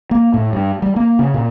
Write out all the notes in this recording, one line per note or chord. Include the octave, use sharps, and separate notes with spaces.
A#3
A2
G2
G3
A#3
C#3
A#2